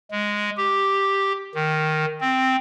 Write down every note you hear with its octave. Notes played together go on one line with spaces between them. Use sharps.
G#3
G4
D#3
C4